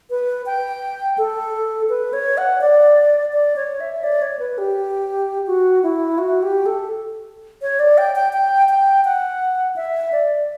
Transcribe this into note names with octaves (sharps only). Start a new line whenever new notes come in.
B4
G5
A4
B4
C#5
F#5
D5
D5
C#5
E5
D5
C#5
B4
G4
F#4
E4
F#4
G4
A4
C#5
D5
G5
G5
G5
G5
F#5
E5
D5